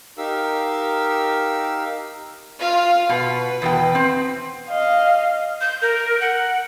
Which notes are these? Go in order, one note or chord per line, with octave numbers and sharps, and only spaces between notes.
D#4 G4 A#4 F5 E6
F4 F5
B2 B4
E2 B2 G5
C4
D#5 F5
G6
A#4
F#5